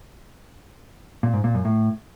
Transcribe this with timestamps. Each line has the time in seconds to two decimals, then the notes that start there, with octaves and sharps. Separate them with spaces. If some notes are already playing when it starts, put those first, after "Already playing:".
1.23 A#2
1.34 G#2
1.44 A#2
1.54 F#2
1.65 A2